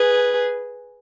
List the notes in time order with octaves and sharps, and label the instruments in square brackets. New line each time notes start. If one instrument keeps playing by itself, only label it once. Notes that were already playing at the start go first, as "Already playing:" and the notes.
Already playing: [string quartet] G#4 B4